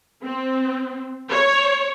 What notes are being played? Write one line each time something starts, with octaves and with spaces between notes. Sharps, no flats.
C4
C#5